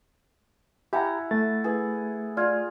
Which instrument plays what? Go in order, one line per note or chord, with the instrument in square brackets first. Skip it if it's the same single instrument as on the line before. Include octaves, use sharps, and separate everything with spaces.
[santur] E4 F#5 [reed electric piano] G4 A#5 [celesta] G#5
[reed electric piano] A3 A6
[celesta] E4 B4 [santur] G#4
[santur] F4 [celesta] D5 F6 G#6